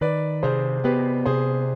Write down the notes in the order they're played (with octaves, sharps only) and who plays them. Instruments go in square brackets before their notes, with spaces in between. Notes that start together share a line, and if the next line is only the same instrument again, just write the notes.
[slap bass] D#3 [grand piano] B4 D5
[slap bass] C3 [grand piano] G#4 C5
[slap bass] B3 [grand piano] G4 B4
[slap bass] C3 [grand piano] G#4 C5